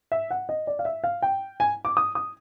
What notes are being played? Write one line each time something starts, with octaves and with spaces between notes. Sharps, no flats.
E5
F#5
D#5
D5
F5
E5
F5
G5
G#5
D6
D#6
D#6